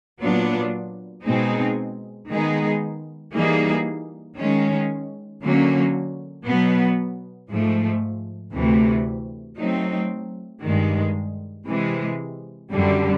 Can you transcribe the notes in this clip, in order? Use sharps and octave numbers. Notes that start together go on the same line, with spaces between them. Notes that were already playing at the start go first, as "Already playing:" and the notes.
A#2 F#3 B3 D4 F4
B2 G#3 C4 D#4 G#4
D#3 G#3 B3 D#4 G#4
E3 G3 A#3 D#4 G#4
D#3 G#3 C#4
D3 F#3 A#3 C#4
B2 F#3 B3
G#2 F3 A3
D2 C3 E3 A3
F#3 A3 C4 D#4
G2 D#3 G#3
C3 E3 G#3
F#2 D3 G3